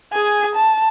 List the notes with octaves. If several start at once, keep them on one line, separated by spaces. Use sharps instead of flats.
G#4 G#5
A5